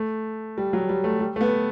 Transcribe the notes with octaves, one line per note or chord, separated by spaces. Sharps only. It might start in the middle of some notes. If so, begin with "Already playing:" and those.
Already playing: A3
G3
F#3
G3
A3
G3
A3
B3